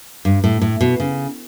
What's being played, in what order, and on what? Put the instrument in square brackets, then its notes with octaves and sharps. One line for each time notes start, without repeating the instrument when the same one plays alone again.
[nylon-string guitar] G2
A2
A2
B2
C#3